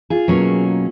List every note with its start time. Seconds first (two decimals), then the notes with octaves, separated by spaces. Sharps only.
0.10 F4 G#4
0.28 B2 F#3 A#3 C#4